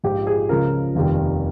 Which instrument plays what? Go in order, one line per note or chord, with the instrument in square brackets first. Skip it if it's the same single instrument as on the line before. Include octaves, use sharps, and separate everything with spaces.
[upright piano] A#1 G#2 F3 G#3 G4
G#4
C#2 C#3 F3 G#3 A#4
F1 D#2 D#3 G3